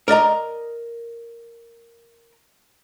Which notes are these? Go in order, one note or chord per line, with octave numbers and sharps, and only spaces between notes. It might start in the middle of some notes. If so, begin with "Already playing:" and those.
A#4 D5 D#5 A#5